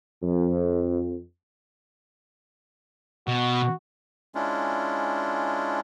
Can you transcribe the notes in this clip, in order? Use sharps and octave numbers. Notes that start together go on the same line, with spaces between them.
F2
B2 F#4
G#3 C#4 D4 E4 F4